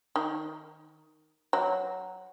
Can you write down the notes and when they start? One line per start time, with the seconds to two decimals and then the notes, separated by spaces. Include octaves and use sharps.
0.16 D#3
1.53 F#3